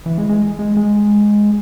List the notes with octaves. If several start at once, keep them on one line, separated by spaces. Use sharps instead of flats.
E3
G#3
G#3
G#3
G#3